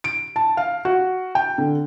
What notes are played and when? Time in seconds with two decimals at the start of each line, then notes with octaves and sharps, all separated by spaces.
0.04 D7
0.36 A5
0.57 F5
0.85 F#4
1.35 G5
1.58 D3